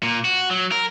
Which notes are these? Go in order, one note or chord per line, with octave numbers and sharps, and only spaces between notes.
A#2
F#4
F#3
A#4